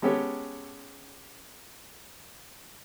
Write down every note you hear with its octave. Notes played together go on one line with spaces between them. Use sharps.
G#3 B3 C#4 G4 A4 C#5